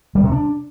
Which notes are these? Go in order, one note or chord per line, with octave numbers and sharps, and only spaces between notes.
G3
C3
D4